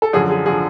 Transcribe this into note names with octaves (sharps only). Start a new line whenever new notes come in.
A4
F#2 D3 F3 G#4
G#4
D3 F3 G#4